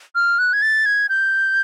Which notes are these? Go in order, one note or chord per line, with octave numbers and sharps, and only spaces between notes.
F6
F#6
G#6
A6
G#6
G6